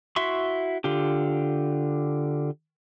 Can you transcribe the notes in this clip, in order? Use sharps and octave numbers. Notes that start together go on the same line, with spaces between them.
E4 F#4 E5 C6 C#6
D3 F4 G4